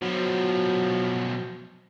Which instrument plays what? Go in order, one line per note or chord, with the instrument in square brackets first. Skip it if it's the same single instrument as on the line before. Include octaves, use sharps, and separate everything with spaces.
[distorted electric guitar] B2 F3 [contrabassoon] F#3